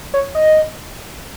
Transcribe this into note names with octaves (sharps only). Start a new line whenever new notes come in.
C#5
D#5